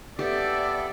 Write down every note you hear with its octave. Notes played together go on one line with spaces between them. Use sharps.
B3 G4 A4 D5 E5